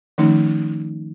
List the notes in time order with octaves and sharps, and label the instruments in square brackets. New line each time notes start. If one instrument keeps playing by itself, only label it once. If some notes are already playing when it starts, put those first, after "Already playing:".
[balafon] D#3 F3 A3 C#4 D#4